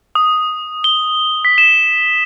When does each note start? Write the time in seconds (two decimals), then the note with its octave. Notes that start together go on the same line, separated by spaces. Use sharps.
0.15 D#6
0.84 G7
1.45 B6
1.58 E7